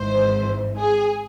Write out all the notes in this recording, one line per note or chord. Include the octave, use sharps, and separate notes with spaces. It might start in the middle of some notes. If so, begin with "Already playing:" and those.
Already playing: G#1 G#2 E3 C5
G#4